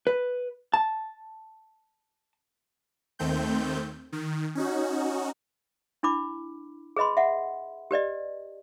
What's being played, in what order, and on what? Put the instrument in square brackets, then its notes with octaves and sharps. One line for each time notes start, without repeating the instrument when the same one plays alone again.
[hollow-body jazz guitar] B4
A5
[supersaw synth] D#2 D#3 A3 C4 G6
D#3
C#4 D#4 F#4
[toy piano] D4 E4 B5 D6
G#4 B4 D#5 B5 C6
E5 F#5
G4 B4 D5 D#5